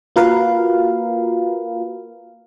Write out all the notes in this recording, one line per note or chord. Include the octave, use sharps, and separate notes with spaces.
A#3 F4 F#4 A#4 B4 F5